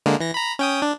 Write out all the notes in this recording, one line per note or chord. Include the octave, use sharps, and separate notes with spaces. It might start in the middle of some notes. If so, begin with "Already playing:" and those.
D3 G#3 A#3
E3 A#6
A#5 B5
C#4 G5 D#6
D4